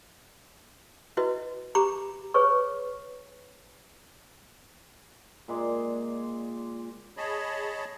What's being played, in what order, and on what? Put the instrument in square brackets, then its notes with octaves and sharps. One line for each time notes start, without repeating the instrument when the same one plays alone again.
[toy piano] E4 F#4 B4 D#5
G4 A#5 B5 D6
G#4 B4 C#5 C#6
[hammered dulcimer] A#2 G#3 D5 C6
[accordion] G#4 C#5 D#5 A5 B5